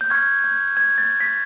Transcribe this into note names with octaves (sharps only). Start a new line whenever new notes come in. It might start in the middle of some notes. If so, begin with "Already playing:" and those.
G6
C#6 F6 G#6
G6
G#6
A6
B6